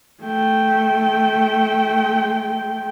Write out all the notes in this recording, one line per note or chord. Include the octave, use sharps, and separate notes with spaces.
A3 G5